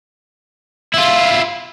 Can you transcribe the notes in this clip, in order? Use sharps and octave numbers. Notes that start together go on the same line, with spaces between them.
E4 F4